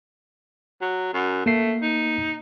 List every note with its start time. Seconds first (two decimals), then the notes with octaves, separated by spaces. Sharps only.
0.81 F#3
1.13 F#2
1.46 A3 A#3 C7
1.82 D#4